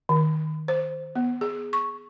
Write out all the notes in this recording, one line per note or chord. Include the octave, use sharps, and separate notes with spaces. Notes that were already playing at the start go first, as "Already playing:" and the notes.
D#3
C5
B3
G#4
C#6